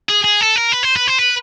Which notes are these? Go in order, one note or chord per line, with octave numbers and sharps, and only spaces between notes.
G#4
G#4
A4
A#4
B4
C5
B4
C5
B4